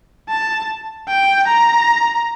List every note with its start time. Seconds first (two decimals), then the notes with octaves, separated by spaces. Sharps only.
0.29 A5
1.08 G5
1.47 A#5